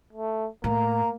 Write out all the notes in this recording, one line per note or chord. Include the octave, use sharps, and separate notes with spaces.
A3
A2 A#3 A#5